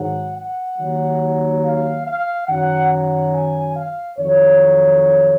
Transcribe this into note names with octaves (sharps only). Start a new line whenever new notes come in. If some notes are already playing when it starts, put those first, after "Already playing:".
Already playing: G#2 D#3 F#3 F#5
F#5
D#2 D#3 F#3
F5
F5
F#2 D#3 F#3 F#5
F#5
G#5
F5
F2 D#3 F#3 C#5